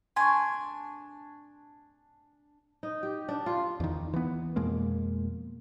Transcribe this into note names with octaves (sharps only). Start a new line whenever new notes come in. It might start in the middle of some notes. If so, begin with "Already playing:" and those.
D4 G#5 C6 C#6
D#4
G4
D4
F4
E2 D#3
E3 B3
F2 B2 G#3 A#3